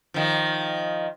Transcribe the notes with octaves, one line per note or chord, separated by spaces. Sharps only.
D#3 F3